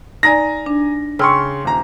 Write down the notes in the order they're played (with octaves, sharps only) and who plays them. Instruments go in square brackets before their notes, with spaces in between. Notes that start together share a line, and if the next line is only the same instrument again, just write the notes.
[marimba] D#4 D5 [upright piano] G#5 A#5 A#6
[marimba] D4
[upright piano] C#3 C6 C#6 [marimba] G5 E6 F6
[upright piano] D#1 A#5